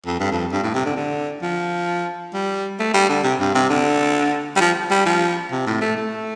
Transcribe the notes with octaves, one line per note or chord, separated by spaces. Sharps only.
F2
G2
F2
G2
A2
C3
D3
D3
F3
G3
A3
G3
D3
C3
G2
C3
D3
G3
F3
G3
F3
C3
A2
A3
A3